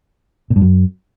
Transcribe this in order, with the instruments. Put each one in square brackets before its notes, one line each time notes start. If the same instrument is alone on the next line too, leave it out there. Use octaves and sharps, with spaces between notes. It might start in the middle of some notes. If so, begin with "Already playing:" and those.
[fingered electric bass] A#2
G2
F#2